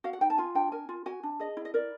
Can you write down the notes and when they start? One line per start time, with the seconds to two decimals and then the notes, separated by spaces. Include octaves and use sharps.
0.04 F#4 F5
0.13 F#5
0.21 D#4 G5
0.30 A5
0.38 F4 G#5
0.55 D4 G5
0.72 A#4 G#5
0.89 F4
1.06 F#4 G#5
1.23 D4
1.40 G#4 D#5
1.57 E4
1.65 D#5
1.74 A#4 D5